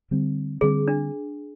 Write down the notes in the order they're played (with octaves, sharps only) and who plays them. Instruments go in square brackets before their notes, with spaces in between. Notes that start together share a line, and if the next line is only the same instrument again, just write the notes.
[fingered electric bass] D3 G3 C4
[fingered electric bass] D3 G3 C4 [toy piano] G#4
[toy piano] D4